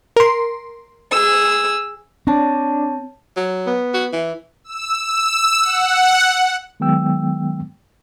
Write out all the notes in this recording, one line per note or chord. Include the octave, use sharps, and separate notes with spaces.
A#4 C6
G#4 E6
C4 D4 C#5 A5 C#6
F#3
B3
F#4
E3
E6
E6
F#5
D#3 F#3 G#3 B3 G5 E6